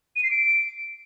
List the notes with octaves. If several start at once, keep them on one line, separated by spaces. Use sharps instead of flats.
D#7
C7
D7